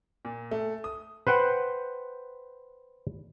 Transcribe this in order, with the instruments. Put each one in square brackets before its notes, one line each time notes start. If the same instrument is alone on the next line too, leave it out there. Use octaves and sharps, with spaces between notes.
[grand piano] A#2
A3
D#6
[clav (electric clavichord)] B4 C5 F#5 G5